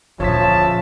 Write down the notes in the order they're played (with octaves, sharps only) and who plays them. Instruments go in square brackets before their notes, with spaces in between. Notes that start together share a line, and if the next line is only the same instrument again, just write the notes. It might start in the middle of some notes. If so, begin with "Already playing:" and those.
[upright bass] D2 A#2 [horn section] C#3 E5 A5 [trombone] F3 [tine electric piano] C#5 B6